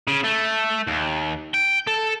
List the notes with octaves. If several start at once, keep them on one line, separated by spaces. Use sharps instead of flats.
C#3
A3
D#2
G5
A4